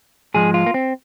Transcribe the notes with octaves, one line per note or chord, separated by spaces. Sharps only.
G#2 F3 G#3 G#4
F4
A#3
C4